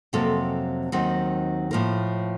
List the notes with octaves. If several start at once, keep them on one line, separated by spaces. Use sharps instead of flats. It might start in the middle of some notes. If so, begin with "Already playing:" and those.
F2 C3 F#3 A#3 A4
D#2 D#3 F#3 C4
A2 F3 A#3 A#4